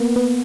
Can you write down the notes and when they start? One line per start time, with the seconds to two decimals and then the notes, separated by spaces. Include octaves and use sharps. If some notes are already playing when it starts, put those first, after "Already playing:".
Already playing: A#3 B3
0.16 B3